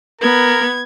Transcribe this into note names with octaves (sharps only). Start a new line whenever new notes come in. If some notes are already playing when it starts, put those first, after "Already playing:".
B3 A#4 G#6